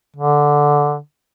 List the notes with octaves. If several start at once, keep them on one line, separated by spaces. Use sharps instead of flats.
D3